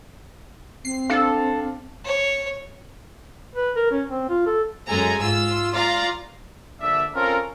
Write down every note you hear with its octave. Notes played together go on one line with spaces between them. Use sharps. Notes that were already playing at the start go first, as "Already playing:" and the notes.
C4 C7
D4 A4 F5
C#5
B4
A#4
C#4
C4
F4
A4
F#2 G#3 A4 G#5 A#5
G#2 F4 E6
F4 D5 F5 A#5
A#1 D3 D4 D5 E5
C4 C#4 F4 A4 A#4